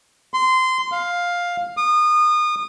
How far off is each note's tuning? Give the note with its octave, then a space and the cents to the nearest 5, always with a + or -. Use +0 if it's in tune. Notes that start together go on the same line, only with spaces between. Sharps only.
C6 -20
F5 +10
D#6 -30